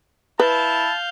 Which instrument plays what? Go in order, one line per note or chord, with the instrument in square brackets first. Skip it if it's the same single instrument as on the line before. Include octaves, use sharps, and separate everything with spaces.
[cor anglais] E4 [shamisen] B4 [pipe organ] F5 G6 [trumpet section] A5